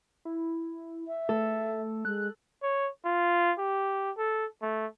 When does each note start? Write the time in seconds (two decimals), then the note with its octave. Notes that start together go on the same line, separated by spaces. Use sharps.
0.25 E4
1.08 E5
1.29 A3 A4
2.05 G#3 F#6
2.63 C#5
3.05 F4
3.58 G4
4.17 A4
4.62 A3